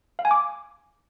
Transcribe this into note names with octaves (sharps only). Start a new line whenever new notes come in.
F5
G#5
D6